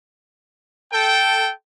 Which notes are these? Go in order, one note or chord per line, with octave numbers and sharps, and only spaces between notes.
A4 G5